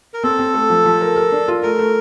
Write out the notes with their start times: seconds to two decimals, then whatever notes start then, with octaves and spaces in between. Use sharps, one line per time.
0.14 A#4
0.24 C4 A4
0.39 C4
0.54 A3
0.70 F3
0.86 F3
1.01 A#4
1.16 A#4
1.32 D4
1.48 F4
1.63 A3 A#4
1.79 A3